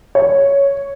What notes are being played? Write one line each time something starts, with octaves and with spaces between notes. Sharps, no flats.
C#5